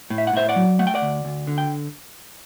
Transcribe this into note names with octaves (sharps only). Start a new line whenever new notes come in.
A2
E5
F#5
A2 C5 E5
D5 F#5
F#3
A3 F#5
G5
D5 F#5
D2
D2
D3
G5